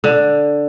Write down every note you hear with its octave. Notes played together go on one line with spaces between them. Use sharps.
D3